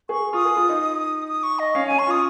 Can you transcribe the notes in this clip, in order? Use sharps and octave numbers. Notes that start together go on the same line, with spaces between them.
G#4 C#6
F4 D#6
G#4
F4
D#4
D#6
C#6
D#5
C#4 F5
C#4 G#5
C#6
F4 D#6